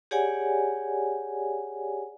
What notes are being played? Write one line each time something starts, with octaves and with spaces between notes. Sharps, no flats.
G4 G#4 C#5 D5 F#5 G#5